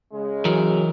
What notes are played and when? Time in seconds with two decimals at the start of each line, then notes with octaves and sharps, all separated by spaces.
0.13 C#3 G#3
0.45 E3 F#3 A#4